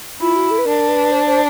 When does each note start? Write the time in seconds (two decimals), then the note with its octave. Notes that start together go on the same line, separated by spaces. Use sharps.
0.20 E4 F4
0.36 F#4
0.51 A4
0.58 B4
0.66 D4 A#4
0.88 B4
1.12 C5
1.26 C5